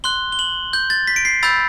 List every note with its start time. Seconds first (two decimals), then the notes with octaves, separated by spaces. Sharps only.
0.04 C6 F#6 G7
0.32 G7
0.39 F#7
0.73 G6
0.90 A6
1.07 B6
1.16 D7
1.25 C7
1.43 B5 E6 G6 A6